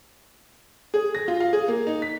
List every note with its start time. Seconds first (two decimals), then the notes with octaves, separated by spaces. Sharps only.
0.94 G#4
1.15 A#6
1.28 F4
1.40 F5
1.53 G#4
1.68 A#3
1.87 D#4
2.02 B6